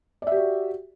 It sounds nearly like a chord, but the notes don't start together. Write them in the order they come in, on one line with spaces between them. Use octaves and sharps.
D5 E5 G4 F#4